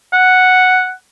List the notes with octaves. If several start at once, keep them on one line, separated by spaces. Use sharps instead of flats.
F#5